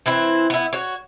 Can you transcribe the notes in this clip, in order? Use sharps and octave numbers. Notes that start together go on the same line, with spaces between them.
E3 C4 E4
B3 E4
F#4 C#5